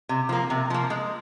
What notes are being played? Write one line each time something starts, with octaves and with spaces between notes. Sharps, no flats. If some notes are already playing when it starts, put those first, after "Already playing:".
C3
F3 A#3
C3
F3 A#3
G#3